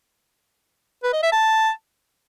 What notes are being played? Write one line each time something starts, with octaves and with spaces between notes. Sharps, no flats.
B4
D#5
E5
A5